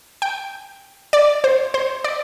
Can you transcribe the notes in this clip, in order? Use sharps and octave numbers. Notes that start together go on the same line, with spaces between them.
G5
D5
C5
C5
D5